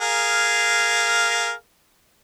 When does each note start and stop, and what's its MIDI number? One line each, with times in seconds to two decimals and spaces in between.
0.01 1.51 68
0.01 1.51 70
0.01 1.51 77